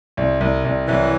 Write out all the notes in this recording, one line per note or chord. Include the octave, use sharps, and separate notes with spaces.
C2
C2
C2
C2 E3 F#3